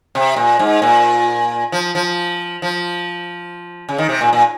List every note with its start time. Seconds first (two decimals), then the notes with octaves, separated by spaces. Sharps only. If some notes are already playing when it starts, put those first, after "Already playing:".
0.15 C3
0.36 A#2
0.59 G#2
0.82 A#2
1.72 F3
1.95 F3
2.62 F3
3.89 C#3
3.98 D#3
4.09 C3
4.21 A#2
4.33 A#2